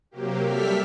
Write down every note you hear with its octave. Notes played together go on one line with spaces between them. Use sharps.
C3 F#3 A#3 G4
G3 G4 A4 E5 F6 B6